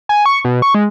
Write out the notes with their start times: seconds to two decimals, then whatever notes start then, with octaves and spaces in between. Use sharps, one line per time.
0.09 G#5
0.26 C#6
0.45 B2
0.62 C#6
0.75 G#3